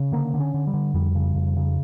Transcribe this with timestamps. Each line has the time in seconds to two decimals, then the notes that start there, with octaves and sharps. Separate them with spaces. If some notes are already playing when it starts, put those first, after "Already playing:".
Already playing: C#3
0.12 D3 A#3
0.34 D3
0.40 C#4
0.54 D3
0.67 G3
0.73 D3
0.94 F2 G3
1.15 C#3
1.35 F2
1.56 C#3